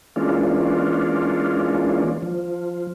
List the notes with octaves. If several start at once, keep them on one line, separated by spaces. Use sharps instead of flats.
E3 G#3 A#3 C#4 D4 F4
F3